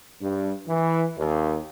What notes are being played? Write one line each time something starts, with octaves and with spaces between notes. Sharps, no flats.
G2
E3
D#2